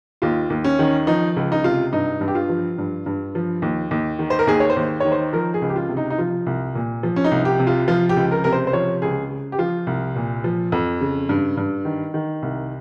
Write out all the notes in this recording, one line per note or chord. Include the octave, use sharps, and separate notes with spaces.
D#2 F4
D#2
C#4
D#3
F3 D#4
C#2
D#4
C3 F4
G2 D#4
G2
G4
F4
F3
G2
G2
F3
D#2
D#2
D#3
C5
A#4
D#2 G#4
C#5
C5
D#2
D#3 C#5
C5
F3 A#4
G#4
C#2
G4
F4
C3
D#4
D#4
F3 F4
C2
A#2
F3
C#4
D#4
C2
G4
C3
F4
F3 F4
G4
C#2
A#4
C3 A#4
C5
C5
F3 C#5
C#2 G#4
C#3
G4
F3 F4
C2
A#2
F3
F2
C#3
G2
G2
D#3
D#3
C2